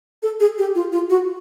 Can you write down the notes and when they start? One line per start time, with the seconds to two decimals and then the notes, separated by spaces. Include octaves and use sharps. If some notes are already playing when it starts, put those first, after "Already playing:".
0.23 A4
0.40 G#4
0.58 G4
0.75 F4
0.92 F4
1.10 F#4